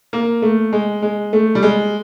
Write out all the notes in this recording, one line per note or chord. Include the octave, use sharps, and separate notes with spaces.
A#3
A3
G#3
G#3
A3
G3
G#3